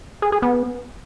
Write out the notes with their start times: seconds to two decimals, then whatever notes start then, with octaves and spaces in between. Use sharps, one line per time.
0.22 G#4
0.32 G#4
0.42 B3